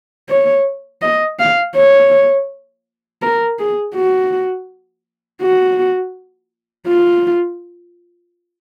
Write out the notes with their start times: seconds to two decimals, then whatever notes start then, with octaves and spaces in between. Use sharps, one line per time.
0.30 C#5
1.02 D#5
1.39 F5
1.75 C#5
3.22 A#4
3.59 G#4
3.95 F#4
5.42 F#4
6.88 F4